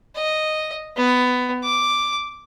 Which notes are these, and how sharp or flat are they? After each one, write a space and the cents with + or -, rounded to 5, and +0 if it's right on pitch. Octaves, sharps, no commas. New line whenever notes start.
D#5 -5
B3 +15
D6 +0